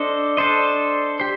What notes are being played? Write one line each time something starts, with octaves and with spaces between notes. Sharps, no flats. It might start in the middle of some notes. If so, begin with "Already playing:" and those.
Already playing: D4 A4 C5 D#5
D4 A4 C5 D#5
G4 C5